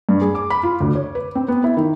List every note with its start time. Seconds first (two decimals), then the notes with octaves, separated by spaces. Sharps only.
0.09 G2
0.21 G#4
0.35 D6
0.50 B5
0.63 F4
0.80 D2
0.95 C#5
1.15 B4
1.35 C4
1.48 B3
1.64 E4
1.77 D#3